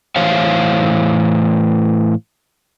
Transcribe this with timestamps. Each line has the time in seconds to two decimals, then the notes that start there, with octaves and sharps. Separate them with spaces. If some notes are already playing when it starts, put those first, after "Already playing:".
0.16 A2 E3 C5 C#5 F5